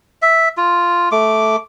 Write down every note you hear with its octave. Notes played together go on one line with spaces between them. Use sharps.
E5
F4
A3 D6